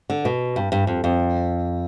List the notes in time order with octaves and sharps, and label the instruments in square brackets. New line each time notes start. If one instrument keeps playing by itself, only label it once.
[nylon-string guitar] D3
B2
G2
G2
F2
F2